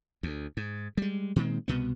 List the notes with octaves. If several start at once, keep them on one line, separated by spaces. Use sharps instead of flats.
D2
G#2
G3 G#3
A#2 D#3 G#3 C4
C2 B2 B3